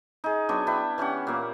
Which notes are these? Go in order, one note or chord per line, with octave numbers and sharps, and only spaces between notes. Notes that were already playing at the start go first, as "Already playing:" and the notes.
D#4 G#4
F#3 B3 D4
D4 E4 B4 G5
E3 C#4 G4 F#5
A#2 A#3